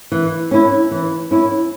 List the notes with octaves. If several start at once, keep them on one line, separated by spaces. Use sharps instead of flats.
E3
C#4 E4
E3
C#4 E4